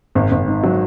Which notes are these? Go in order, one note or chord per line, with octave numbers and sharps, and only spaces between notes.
G#1
G#1
G#2
F#3